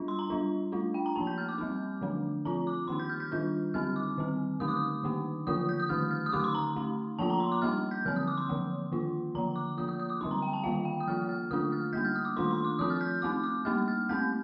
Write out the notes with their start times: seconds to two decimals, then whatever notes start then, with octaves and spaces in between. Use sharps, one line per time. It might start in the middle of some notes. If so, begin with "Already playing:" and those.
Already playing: G3 D4 F4
0.08 C6
0.19 A#5
0.30 G3 D4 F4
0.72 A3 D4 F4
0.94 G5
1.06 A#5
1.16 F3 A#3 D#4 A5
1.27 G6
1.38 F6
1.48 D6
1.58 G3 C4 D#4
2.01 D3 F3 A3 D4
2.45 F3 C4 F4 A#5
2.67 D6
2.88 D#3 A#3 D#4 C6
2.99 G6
3.10 F6
3.20 G6
3.32 D#3 G3 D4 F4
3.74 D3 G3 C4 D#4 F6
3.96 D6
4.18 D#3 G3 C4
4.60 D3 A3 D#4 D#6
4.68 D6
4.77 D#6
5.04 D#3 A#3 D#4
5.47 D3 F3 A#3 F4 D#6
5.69 G6
5.80 D#6
5.89 D#3 A3 D#4 F6
6.11 F6
6.26 D#6
6.32 D3 A3 D#4 D6
6.44 C6
6.55 A#5
6.76 A3 D#4
7.19 F3 A#3 F4 A5
7.30 A#5
7.40 C6
7.52 D6
7.62 G3 A#3 D#4 F6
7.91 G6
8.05 D3 F3 C4 F6
8.16 D#6
8.28 D6
8.38 C6
8.49 D3 F3 A#3
8.92 D#3 A#3 F4
9.35 D3 F3 A#3 A#5
9.56 D6
9.77 F3 A#3 F4 D#6
9.89 D#6
10.00 D#6
10.09 D6
10.21 D3 G3 C4 D#4 C6
10.31 A#5
10.42 G5
10.53 A5
10.64 D#3 G3 A#3 F4 F5
10.85 G5
11.00 D#6
11.08 F3 A#3 F4 F6
11.29 F6
11.51 D3 A3 D4 F4 D#6
11.72 F6
11.93 G3 A#3 D#4 G6
12.05 F6
12.15 D#6
12.25 D6
12.37 D#3 A3 D4 F4 C6
12.51 C6
12.65 D6
12.79 F3 C4 F4 D#6
12.90 F6
13.01 G6
13.22 A3 C4 D#4 D6
13.43 D6
13.65 G3 A#3 D#4 F6
13.88 F6
14.09 A3 C4 D#4 G6